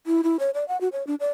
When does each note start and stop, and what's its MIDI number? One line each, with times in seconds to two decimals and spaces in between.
0.07 0.21 64
0.24 0.37 64
0.39 0.51 73
0.54 0.67 74
0.68 0.79 78
0.81 0.88 66
0.92 1.06 73
1.07 1.15 62
1.20 1.31 74